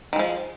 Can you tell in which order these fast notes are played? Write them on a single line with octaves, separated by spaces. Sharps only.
D#3 G#3 F3